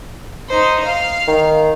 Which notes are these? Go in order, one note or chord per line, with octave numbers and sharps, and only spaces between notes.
D#4 C5
F5
D#3